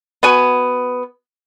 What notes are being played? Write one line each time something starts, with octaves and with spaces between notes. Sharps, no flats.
B3 F#4 G#5